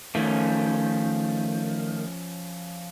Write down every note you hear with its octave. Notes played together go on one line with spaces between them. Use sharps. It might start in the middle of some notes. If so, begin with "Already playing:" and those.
D#3 F3 A3 C#4